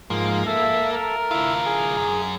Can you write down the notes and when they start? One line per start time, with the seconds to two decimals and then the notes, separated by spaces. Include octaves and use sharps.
0.10 G#2 F3 A#3
0.47 A4 E5
0.92 A#4
1.31 D3 E4 F4
1.66 G#4
1.97 F#2